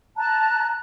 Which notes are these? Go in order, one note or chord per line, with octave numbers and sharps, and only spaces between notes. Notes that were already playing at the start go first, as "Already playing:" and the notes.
A5 A#5 F#6